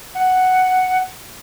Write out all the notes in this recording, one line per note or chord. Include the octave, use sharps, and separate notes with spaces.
F#5